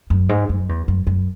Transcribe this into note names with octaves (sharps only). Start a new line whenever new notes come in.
F#2
G#2
F#2
E2
F#2
F#2